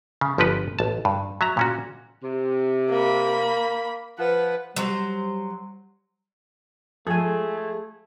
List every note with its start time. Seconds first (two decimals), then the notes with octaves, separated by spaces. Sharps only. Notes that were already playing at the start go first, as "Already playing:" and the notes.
0.21 C#3
0.38 G1 F3 G4 B4 F#5
0.79 A1 A5
1.05 G2
1.41 F#3 E5 A#5
1.57 A#2 C#4 F#4
2.23 C3
2.90 A#3 B5
4.18 F3 B4 F#5
4.76 F#3 G3 C5
7.07 F3 G#3 A3 G#4 A4 G#5